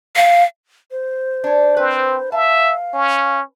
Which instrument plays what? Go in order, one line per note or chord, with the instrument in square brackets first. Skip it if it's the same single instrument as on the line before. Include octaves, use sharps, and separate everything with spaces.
[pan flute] F5
[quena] C5
[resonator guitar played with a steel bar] D4 C#5
[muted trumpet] C4 [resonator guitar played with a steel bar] B4
[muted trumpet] E5 [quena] F5 [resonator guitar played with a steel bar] A5
[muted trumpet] C#4